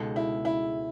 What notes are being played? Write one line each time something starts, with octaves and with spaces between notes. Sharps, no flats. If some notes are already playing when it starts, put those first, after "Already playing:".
Already playing: C#2 B2 G#3 D#4 A4
E4
E4